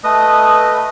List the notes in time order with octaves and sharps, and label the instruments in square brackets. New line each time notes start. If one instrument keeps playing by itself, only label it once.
[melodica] A3 B4 D#5 D#6